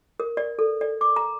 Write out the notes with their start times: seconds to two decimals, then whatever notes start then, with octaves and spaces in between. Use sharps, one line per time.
0.20 A#4
0.37 D5
0.59 A4
0.81 D5
1.01 D6
1.16 A#5